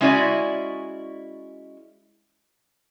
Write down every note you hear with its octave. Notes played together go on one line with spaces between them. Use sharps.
G#3 C#4 E4 F#4 D5 G#5